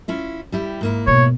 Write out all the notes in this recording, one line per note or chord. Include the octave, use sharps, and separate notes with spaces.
C#4 E4 F4
G3 E4 G4
G#2 A#3 E4
B2 C#5